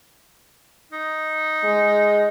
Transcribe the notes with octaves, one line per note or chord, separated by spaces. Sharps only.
D#4
G#3